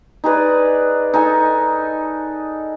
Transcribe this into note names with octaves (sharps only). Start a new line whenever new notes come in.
D#4 G#4 B4 D5
D#4 A4 G#5